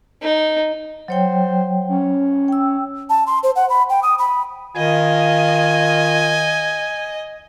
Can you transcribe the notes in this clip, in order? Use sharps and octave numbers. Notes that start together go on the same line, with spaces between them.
D#4
F#3 C5 C#5 G5
C#4
G5 E6
A5
C6
C5
F#5
B5
G5
D#6
B5
D#3 F4 D#5 G#5